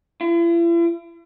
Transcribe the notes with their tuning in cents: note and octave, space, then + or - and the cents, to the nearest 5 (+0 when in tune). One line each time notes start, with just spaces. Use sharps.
E4 +45